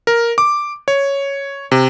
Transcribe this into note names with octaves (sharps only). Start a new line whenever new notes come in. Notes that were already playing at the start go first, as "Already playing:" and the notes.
A#4
D6
C#5
C3